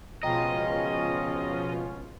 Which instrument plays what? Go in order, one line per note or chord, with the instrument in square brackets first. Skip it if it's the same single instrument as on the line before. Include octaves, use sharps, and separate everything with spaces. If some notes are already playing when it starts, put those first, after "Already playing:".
[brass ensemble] C#2 C#4 [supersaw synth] B2 F3 F4 [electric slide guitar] D#5 [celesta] G5 A#5